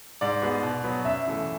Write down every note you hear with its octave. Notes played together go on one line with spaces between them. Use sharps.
G#2 D5
G#3 B3
B2
F#3 B3
F#2 E5
C#3 E3 A3